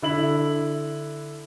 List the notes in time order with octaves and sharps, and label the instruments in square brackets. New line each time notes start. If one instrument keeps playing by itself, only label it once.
[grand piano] D3 E4 F#7